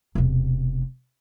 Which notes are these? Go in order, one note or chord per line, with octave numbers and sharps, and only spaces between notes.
E1 C3